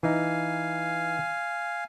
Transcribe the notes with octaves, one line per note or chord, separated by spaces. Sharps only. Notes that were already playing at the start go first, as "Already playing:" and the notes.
E3 D#4 F5 G#5